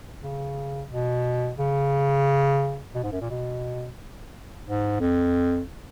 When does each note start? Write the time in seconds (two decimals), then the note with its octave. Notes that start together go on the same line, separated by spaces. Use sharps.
0.22 C#3
0.90 B2
1.59 C#3
2.95 B2
3.03 G#2
3.12 F#2
3.22 A#2
3.30 B2
4.67 G#2
5.00 F2